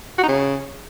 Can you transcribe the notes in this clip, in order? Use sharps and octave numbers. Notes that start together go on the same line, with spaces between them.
F#4
D#4
C#3